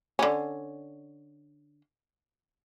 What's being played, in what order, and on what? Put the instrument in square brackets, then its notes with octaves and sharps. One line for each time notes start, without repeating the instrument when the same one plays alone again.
[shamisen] D3 C#4